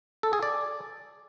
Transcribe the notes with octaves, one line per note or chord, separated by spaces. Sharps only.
A4
G#4
D5